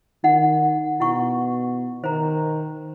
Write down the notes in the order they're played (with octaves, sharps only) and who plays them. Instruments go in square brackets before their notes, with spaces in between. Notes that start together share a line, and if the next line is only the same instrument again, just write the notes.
[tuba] D#3 [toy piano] D#4 F#5
[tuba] B2 [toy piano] E4 F#5 C#6
[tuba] D#3 [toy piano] C5 A#5